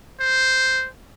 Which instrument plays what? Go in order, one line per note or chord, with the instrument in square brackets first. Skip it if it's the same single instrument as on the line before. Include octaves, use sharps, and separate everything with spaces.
[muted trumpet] C5